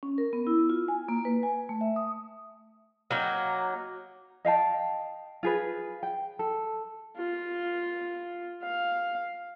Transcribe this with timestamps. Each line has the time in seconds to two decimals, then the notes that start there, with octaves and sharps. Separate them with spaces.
0.03 C#4
0.18 A#4
0.33 B3
0.47 E4
0.70 F4
0.88 G#5
1.08 A#3
1.25 B4
1.43 G#5
1.69 A3
1.81 E5
1.96 D#6
3.11 F#3 A#3 D#4
4.45 D#5 F5 G5 A5
5.43 F4 G#4 B4
6.03 G5
6.39 A4
7.16 F4
8.63 F5